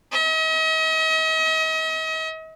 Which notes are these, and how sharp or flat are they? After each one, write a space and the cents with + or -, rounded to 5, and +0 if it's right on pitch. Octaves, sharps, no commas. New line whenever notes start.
D#5 +40